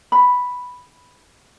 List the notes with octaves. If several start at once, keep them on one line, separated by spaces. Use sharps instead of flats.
B5